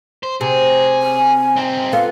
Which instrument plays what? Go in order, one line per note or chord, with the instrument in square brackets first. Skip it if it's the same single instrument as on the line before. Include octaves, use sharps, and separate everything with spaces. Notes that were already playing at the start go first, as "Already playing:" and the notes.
[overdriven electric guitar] C5
[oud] C3 [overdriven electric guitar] G#4
[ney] G#5
[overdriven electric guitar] C4 D#4
[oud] B3 F4 A4 [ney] F5